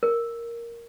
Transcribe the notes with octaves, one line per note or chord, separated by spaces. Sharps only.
A#4